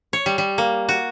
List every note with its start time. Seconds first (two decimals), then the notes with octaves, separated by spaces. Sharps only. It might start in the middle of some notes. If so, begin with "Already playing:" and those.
0.13 C#5
0.26 G3
0.38 G3
0.58 A#3
0.89 F#4